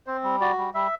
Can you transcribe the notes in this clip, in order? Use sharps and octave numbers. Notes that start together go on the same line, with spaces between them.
C4 C5
G3
F#4 D5
G3
G3 E5